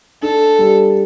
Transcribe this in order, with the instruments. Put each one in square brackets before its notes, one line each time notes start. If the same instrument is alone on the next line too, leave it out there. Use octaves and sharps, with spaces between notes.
[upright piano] D4 [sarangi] A4
[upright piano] G3